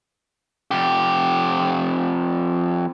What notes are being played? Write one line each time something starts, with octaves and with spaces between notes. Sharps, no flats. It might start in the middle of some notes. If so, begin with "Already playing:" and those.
F2 G4